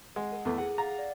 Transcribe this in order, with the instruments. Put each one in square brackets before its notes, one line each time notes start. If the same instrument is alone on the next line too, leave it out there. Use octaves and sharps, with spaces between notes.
[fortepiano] G#3 [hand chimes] F#5
[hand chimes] A#4
[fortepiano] E2 A3
[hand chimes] G#4 A4 [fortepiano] F#5
[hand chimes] F5 F#5 A6 [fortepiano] A#5
[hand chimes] D5